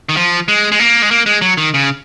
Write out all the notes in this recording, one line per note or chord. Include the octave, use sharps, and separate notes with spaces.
D#3
F3
G#3
G#3
A#3
G#3
A#3
G#3
F#3
D#3
C#3